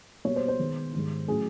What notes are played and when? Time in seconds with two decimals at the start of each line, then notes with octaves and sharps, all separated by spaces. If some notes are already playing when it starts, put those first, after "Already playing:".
0.25 B2 G3 A#3 C#5
0.36 C5
0.48 C5
0.59 D#3 G#3 B3 D#4
0.93 G#2 D#3 G3
1.27 A2 F#3 A3 C#4 G#4